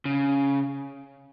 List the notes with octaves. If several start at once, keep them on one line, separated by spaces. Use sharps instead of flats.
C#3